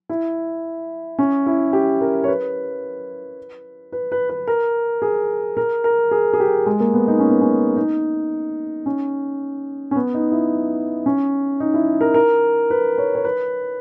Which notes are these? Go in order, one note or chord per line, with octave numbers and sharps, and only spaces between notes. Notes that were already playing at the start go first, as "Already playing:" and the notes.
E4
C#4
E4
G4
A#4
C#5
B4
B4
B4
B4
A#4
G#4
A#4
A#4
G#4
G#4
G4
G#3
A#3
B3
D#4
C#4
B3
C#4
D#4
C#4
C#4
B3
D#4
E4
C#4
D#4
E4
A#4
A#4
B4
C#5
C#5
B4